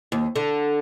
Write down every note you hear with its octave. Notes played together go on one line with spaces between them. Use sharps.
D#2
D3